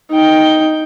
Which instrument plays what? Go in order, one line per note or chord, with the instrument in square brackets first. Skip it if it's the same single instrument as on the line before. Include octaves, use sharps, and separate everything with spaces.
[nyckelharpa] D#4 G5